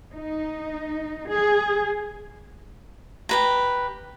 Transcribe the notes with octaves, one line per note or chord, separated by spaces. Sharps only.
D#4
G#4
G4 B4 A#5